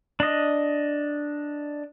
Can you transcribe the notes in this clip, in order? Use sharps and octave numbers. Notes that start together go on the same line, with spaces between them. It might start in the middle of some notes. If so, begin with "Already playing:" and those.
D4 D#5